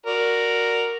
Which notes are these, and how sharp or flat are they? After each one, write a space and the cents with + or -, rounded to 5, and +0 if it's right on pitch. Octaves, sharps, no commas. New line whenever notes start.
F#4 +0 A#4 +0 D5 +0